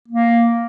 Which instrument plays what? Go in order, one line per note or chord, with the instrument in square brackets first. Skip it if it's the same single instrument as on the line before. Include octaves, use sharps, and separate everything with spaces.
[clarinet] A#3